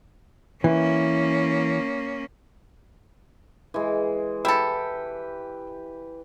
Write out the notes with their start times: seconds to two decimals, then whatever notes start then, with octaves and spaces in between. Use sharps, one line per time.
0.64 E3 A#3 C#4
3.74 E3 G#3
4.45 E4 G4 A4 B4 G5